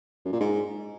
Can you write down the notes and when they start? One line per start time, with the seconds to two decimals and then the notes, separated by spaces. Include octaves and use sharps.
0.25 F#2
0.33 A#2
0.40 G#2